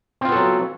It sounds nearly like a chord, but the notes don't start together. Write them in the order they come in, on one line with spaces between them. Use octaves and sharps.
C4 F4 B3 A4 F#3